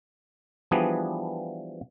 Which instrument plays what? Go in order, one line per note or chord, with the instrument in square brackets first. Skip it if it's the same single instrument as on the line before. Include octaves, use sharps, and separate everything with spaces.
[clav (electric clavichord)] E3 F3 G3 B3 D4 G#4